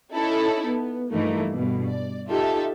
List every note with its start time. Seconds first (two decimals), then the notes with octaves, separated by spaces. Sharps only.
0.14 C#4 D#4 E4 A4
0.67 B3
1.12 G2 E3 F3 A3 A#3 D#4
1.53 G2 B2
1.89 D5
2.30 D#4 F4 G4 A4 E5